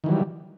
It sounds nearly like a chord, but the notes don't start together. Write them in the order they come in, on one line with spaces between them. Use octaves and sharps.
D#3 E3 F#3 G3